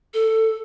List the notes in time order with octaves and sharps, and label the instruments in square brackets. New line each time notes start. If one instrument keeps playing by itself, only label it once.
[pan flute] A4